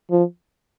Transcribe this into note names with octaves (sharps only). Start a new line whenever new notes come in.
F3